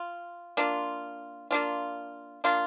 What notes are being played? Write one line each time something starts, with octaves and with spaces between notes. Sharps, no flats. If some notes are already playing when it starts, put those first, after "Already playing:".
Already playing: F4
A#3 D4 F4
A#3 D4 F4
A#3 D4 F4